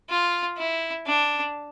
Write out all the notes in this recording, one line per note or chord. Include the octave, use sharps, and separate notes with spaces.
F4
E4
D4